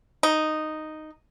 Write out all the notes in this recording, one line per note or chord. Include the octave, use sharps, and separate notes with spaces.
D#4